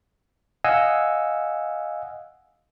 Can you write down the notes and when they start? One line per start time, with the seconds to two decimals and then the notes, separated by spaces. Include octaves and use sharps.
0.64 D#5 F5 F#5 G#5 E6